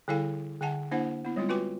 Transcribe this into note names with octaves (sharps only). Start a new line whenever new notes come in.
D3 G3 E4 A4 F5 G#5
D3 E5 F#5 G#5 A5
A#3 D4 E4 C5 F#5
B3 E4
G3 G#3 C4 F4
F4 F#4 B4 G5 G#5 D6